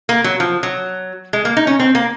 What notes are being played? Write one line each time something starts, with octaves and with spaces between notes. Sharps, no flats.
A#3
F#3
F3
F#3
G#3
A#3
D#4
C#4
C4
A#3